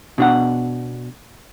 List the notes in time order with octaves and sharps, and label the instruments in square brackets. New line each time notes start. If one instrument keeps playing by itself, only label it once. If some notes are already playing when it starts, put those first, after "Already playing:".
[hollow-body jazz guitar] B2 D4 F#5